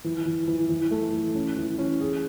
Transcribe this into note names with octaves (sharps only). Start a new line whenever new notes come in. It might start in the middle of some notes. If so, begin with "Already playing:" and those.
E3
E3
E3
E3
A3
E3
C#4
E3
C#4
G#4